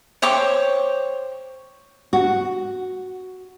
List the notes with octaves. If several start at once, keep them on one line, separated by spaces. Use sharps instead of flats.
C5 C#5 G5 D6
F#4